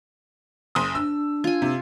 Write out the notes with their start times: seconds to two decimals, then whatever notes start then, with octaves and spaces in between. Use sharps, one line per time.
0.75 F#1 C6 D#6
0.95 D4 E6
1.44 F4 G#5
1.62 C3